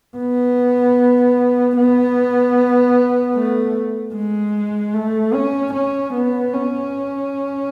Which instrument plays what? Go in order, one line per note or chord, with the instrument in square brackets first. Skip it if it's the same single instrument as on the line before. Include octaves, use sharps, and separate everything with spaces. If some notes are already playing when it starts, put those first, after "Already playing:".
[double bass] B3
B3
A3
G#3
A3
C#4
C#4
B3
C#4